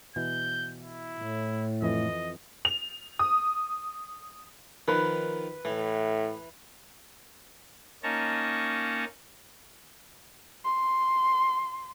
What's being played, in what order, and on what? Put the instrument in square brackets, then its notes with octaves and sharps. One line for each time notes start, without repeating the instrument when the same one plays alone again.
[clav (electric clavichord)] B2 E3 [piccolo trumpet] G6
[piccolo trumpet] E4
[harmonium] A2
[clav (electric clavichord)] F2 E3 [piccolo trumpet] D#5
[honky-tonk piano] F7
D#6
[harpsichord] D#3 F3 [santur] B4
[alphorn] A2 [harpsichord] E3
[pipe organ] A#3 C#4 D#4 A5 A#5 C#6
[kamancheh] C6